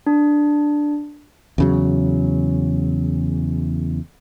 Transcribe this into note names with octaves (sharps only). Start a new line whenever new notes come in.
D4
E2 C#3 F#3